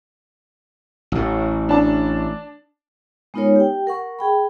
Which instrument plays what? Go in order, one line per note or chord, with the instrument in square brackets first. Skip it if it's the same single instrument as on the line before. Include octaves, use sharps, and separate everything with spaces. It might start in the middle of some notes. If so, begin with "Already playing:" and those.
[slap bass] A1 A2
[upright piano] D4 A5
[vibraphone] G#3 B3 D#4 F4 A#4 C#5
G4 G5
A#4 F#5 C#6
G#4 G5 B5